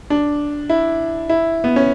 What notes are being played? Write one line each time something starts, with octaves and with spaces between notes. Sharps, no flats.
D4
E4
E4
B3
C#4